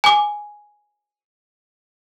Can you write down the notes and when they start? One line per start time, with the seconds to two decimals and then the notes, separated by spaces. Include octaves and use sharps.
0.04 G#5 D6